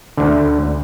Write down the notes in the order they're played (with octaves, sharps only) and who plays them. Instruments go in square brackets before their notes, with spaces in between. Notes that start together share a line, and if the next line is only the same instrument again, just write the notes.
[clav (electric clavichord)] D2 D3